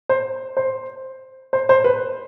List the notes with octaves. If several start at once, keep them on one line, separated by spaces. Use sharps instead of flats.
C5
C5
C5
C5
B4